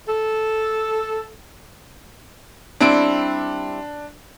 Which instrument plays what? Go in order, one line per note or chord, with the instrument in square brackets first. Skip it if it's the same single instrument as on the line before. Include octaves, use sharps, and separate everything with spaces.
[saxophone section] A4
[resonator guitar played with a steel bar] G3 C4 E4 [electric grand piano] D4 D7